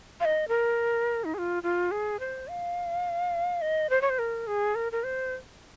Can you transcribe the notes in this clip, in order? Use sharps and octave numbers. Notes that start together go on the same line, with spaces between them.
F5
D#5
A#4
D#4
G#4
F4
F4
G#4
C5
F5
D#5
C5
C#5
C5
A#4
G#4
A#4
A#4
C5